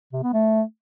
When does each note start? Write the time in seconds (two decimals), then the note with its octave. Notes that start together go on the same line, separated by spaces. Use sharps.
0.13 C3
0.23 B3
0.33 A3